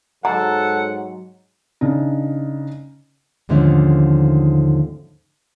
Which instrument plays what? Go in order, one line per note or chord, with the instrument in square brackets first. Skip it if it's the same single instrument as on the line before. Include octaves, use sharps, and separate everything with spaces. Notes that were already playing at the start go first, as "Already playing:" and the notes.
[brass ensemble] G#2 F#3 [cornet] A4 [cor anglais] F#5 [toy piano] A#5
[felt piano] C#3 D4 D#4
[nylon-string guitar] D#2 G#2 D3 F3 A3 C#4